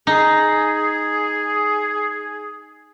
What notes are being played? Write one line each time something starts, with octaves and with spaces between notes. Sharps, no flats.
D#4 G#4